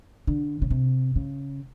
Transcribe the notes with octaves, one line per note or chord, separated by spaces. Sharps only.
D3
C#3
C3
C#3